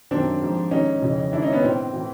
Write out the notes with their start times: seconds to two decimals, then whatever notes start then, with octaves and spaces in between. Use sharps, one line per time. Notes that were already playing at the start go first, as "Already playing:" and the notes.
0.11 F#2 D#3 C4 D4
0.41 G#2 F3
0.71 G#2 D#3 C#4 D#4
1.02 F2 C#3 E3
1.32 G#2 D#3 D4 E4
1.42 C#4 D#4
1.53 B3 C#4
1.63 A2 E3 C4
1.93 A2 E3